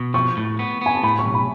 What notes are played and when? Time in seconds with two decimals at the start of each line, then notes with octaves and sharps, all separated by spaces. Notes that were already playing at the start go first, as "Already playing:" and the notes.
Already playing: B2
0.14 F3 C#6
0.37 A2
0.59 B3
0.81 B3 G#5
0.95 A5
1.03 A2 B5
1.19 C#6
1.26 B1
1.34 B5